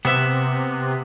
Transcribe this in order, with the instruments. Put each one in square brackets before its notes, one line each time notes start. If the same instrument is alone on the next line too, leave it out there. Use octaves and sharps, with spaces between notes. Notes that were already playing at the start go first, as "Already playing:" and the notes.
[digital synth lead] C3 [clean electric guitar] B3 C4 E5